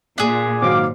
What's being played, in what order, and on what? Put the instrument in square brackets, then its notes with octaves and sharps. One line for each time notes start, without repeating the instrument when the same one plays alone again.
[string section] A#2 [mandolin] D4 G#4
[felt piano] G#2 D#3 F#3 [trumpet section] F5 D6